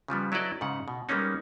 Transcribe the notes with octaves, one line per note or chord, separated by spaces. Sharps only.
C#3 F3 G3 B3
F#3 E4 A4 B4 D5 D#5
G#2 C#3 F#5
B2
G3 G#3 A#3 B3 C#4 D#4